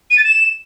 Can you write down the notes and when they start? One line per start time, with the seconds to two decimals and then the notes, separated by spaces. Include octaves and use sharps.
0.11 D#7
0.18 A6
0.25 E7